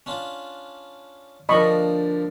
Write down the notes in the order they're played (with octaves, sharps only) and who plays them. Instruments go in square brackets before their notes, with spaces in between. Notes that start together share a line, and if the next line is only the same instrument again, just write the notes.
[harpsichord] C#4 D4 F4
[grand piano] D3 F3 D4 [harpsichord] G3 A#3 [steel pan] D#5 B5 C#6